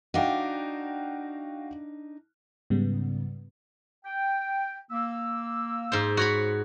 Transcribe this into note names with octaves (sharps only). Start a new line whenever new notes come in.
D4 D#4 F#4 F5 G5
G#2 C#3 G3 B3
G5
A#3 E6
G#2 C5
F#4 C#5 B5